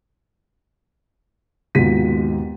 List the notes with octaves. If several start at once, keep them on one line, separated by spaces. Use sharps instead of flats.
D#2 G#2 B2 F4 B6 D#7